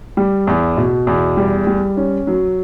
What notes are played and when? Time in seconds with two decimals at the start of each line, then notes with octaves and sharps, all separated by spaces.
0.17 G3
0.47 E2
0.77 B2
1.07 E2
1.37 G3
1.67 G3
1.97 C#4
2.27 F#3